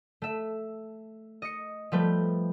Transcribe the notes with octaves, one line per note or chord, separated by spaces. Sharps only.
A3 E5
D#5 C#7
F3 G3 A3 B4 B5 G6